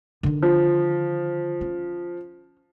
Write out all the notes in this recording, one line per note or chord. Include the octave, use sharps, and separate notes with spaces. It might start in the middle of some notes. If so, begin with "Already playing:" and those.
D3 D#3
F3
C#4